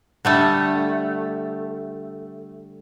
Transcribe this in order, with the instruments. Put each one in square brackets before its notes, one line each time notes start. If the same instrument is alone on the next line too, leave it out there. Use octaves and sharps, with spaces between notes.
[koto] D3 G3 A3